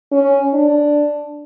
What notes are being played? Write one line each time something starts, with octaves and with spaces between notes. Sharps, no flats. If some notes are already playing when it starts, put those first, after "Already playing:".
C#4
D4